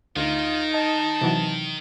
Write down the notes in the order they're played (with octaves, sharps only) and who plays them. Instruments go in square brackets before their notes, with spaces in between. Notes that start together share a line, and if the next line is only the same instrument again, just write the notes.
[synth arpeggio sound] D2 [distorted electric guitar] D#3 [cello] D#4 [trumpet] F4
[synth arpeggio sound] D#5 [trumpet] A5
[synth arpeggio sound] C3 E3 F#3